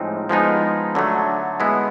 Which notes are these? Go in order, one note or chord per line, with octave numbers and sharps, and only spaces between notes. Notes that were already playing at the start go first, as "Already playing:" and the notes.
Already playing: A2 F3 G#3 C4 D#4
F3 G#3 B3 D#4
D3 F#3 A3
G#3 B3 E4